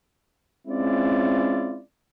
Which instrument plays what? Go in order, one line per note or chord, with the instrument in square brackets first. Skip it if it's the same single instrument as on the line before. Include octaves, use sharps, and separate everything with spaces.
[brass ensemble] G#3 C4 C#4 E4 F4 D5